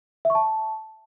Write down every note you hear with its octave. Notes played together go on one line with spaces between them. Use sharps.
E5
C#6
A5